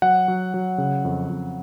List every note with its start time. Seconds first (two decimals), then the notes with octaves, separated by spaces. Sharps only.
0.02 F#3 F#5
0.28 F#3
0.54 F#3
0.78 C#3
1.05 F2
1.29 F2